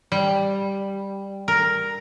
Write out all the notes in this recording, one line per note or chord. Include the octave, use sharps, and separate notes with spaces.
G3
A#4